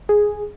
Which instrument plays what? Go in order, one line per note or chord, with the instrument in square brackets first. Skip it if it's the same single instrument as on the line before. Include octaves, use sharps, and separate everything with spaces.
[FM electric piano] G#4